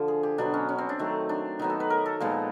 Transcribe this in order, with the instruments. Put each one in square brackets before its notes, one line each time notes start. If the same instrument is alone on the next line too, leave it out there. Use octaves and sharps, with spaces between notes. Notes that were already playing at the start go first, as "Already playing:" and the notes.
Already playing: [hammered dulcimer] D3 F3
G#4
G4
B2 F#3 B3 D4
C#4
C#4
C4
D4
D#3 F#3 A3
D4
D#3 F#3 B3 D#4
A4
B4
A#4
A4
A#2 F3 G#3 B3